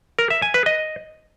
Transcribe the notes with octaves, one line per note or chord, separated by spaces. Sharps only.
A#4
E5
G#5
B4
D#5